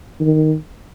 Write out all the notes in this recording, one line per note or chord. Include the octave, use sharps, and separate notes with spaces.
D#3